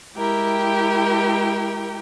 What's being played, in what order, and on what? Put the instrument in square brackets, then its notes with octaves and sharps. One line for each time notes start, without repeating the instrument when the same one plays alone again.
[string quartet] G#3 E4 G4 A#4 G5